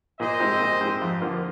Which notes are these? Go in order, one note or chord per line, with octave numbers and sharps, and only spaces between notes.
A#2 C5 D#5
G#3 C4 D#4 G4
A#2
G#3 C4 D#4 G4
F2
D3 F3 A#3 F4